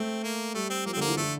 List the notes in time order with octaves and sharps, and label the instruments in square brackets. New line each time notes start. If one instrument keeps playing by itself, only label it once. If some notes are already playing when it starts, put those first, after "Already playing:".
Already playing: [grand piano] A3 [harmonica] C4
[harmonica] A#3
[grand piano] G3 [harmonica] A3
[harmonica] C4
[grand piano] F3 [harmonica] A#3
[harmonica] C4
[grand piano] D3 [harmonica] A#3
[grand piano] E3
[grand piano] D3 [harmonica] A3